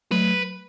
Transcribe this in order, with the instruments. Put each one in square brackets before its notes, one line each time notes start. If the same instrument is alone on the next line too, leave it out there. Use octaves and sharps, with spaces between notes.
[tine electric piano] F#3 A3 [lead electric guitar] B4